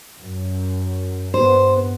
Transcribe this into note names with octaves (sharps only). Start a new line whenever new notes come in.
F#2
G2 B3 C5